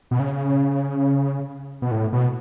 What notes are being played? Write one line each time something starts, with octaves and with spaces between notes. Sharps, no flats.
B2
C#3
B2
A2
B2